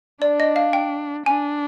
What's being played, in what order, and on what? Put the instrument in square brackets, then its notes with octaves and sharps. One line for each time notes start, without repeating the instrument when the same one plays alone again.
[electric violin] D4 [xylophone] D5
[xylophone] D#5
F5
G5
[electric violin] D4 [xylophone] G#5